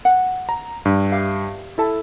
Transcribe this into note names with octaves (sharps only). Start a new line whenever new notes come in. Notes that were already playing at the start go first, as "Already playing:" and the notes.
F#5
A#5
G2
G4 E5 F5
E4 A4 A5